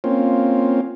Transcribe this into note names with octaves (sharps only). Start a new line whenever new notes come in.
A#3 C4 C#4 F4